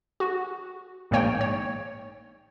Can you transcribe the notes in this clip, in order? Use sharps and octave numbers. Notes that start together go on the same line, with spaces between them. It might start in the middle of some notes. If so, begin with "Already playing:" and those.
F#4
A#1 G#2 D#3 A#3 C#5 G5
C#5